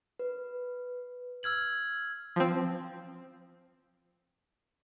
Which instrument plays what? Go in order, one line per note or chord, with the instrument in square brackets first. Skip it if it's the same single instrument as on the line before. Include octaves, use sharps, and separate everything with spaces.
[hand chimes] B4
[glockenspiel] E6 F6 G#6 F#7
[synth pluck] F3 C4